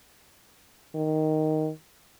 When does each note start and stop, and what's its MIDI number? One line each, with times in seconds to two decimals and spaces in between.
0.95 1.70 51